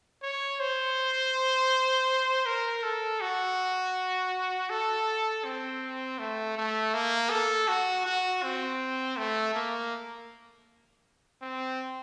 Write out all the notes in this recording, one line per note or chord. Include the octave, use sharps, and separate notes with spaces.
C#5
C5
A#4
A4
F#4
A4
C4
A3
A3
A#3
A4
F#4
F#4
C4
A3
A#3
C4